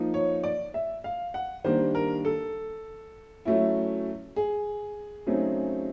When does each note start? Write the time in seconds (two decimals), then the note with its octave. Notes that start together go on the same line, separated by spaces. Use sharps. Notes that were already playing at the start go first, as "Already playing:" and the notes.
Already playing: F3 A#3 D#4
0.14 C#5
0.44 D5
0.74 E5
1.04 F5
1.34 F#5
1.64 D#3 G3 A#3 D4 C5
1.95 A#4
2.25 A4
3.45 F#3 A3 C#4 E4
4.36 G#4
5.27 C#3 F#3 A3 C4 D#4